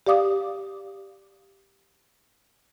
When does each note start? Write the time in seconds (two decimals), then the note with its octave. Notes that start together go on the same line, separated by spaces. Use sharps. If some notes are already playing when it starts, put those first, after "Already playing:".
0.07 G4 D5 F5 D6 D#6